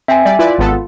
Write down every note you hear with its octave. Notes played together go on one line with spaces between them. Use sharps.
C4 E5 G#5
G3 D5
E4 F4 B4 D5
G#1 B3 A4